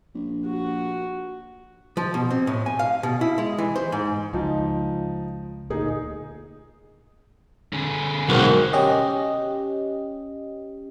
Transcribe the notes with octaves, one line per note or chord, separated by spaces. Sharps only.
A#1
F#4
F3
B2
C4
A2
G#5
F5
B2
E4
G#3
E3
C5
G#2
C#2 F3 D#4
D2 A#2 D#4 G#4
D3 G#4
B1 G#3 C4 F#4 A#4
C#4 G4 D#5